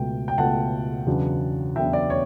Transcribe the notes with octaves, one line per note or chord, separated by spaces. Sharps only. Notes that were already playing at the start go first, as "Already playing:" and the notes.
Already playing: C#2 B2 A3 G5
G5
C#2 B2 A3 F#5 A5
E2 C#3 F#3 B3 D4
E2 C#3 F#3 B3 D4 E5 G5
D5
C#5